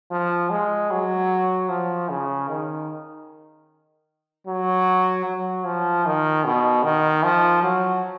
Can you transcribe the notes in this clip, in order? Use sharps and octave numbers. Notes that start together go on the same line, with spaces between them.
F3
G#3
F#3
F3
C#3
D#3
F#3
F#3
F3
D#3
B2
D#3
F3
F#3